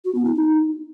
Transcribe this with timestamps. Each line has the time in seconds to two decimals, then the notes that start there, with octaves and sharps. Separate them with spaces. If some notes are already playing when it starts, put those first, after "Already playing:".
0.05 F#4
0.15 B3
0.25 E4
0.35 D#4